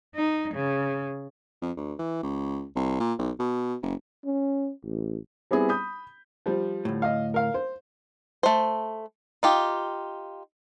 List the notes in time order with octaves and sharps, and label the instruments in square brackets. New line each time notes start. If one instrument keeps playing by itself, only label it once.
[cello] D#4
C#3
[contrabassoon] F2
D2
E3
C#2
C2
A#2
B1
B2
F#1
[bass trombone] C#4
A1
[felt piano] G3 B3 C4 E4 G#4
B5 D#6 G6
[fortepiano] F3 G3
[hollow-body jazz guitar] D2 A2
[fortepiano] D#5 F5
A#4 F5
C5
[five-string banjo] A3 C5
D#4 F4 G4